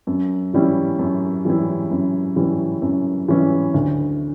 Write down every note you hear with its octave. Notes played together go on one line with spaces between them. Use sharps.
F#2
E3 G3 C#4 E4
F#2
E3 G3 C#4 E4
F#2
E3 G3 C#4 E4
F#2
E3 G3 C#4 E4
D2